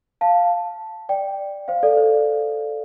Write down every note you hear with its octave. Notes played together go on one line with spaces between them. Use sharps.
F5 A5
D5 G5
C5 F5
A4 D5
C5